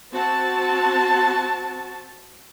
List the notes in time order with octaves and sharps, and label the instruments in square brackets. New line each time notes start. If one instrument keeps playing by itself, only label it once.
[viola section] C4 F#4 A5